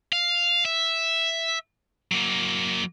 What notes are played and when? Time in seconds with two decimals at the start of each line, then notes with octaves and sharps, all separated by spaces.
0.13 F5
0.65 E5
2.12 F#3 A#3